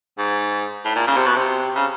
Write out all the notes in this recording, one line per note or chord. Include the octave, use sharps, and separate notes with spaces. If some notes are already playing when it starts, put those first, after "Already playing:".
G#2
A2
A#2
C#3
C3
B2
C3
C#3